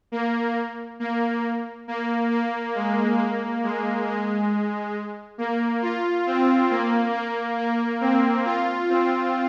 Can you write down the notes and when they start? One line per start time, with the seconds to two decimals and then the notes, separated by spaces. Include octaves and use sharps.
0.12 A#3
1.00 A#3
1.88 A#3
2.31 A#3
2.75 G#3
3.19 A#3
3.63 G#3
4.06 G#3
5.38 A#3
5.82 F4
6.26 C4
6.70 A#3
7.13 A#3
7.58 A#3
8.01 C4
8.45 F4
8.89 C4